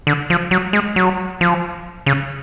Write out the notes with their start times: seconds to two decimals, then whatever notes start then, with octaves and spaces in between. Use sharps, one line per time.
0.07 D3
0.30 F3
0.51 F#3
0.73 G#3
0.96 F#3
1.41 F3
2.06 C#3